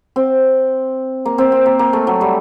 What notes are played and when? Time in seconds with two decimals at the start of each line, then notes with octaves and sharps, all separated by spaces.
0.16 C4
1.25 A#3
1.38 C4
1.52 C4
1.66 A#3
1.79 A#3
1.93 A3
2.07 F#3
2.21 G3